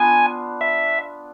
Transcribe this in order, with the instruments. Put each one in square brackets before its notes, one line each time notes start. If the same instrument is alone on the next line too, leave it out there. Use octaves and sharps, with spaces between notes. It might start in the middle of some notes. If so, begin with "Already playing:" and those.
Already playing: [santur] B3 D4 F4 [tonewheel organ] G#5
[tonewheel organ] E5